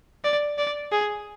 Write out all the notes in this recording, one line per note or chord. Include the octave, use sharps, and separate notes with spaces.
D5
D5
G#4